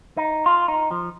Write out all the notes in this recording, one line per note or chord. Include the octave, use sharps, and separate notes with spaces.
D#4
F4
D#4
F3